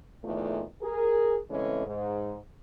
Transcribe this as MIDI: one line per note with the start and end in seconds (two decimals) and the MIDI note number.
0.24 0.63 40
0.24 0.63 46
0.24 0.63 51
0.24 0.63 53
0.24 0.63 57
0.82 1.36 68
0.82 1.36 70
1.50 1.85 49
1.50 1.85 52
1.50 1.85 56
1.50 1.85 57
1.50 1.85 60
1.50 1.85 61
1.86 2.36 44